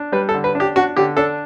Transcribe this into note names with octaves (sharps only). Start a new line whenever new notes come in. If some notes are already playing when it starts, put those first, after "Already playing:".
Already playing: D4
G3 B4
A4
D3
B4
D4
G4
D4 F#4
D3 G4
D4 A4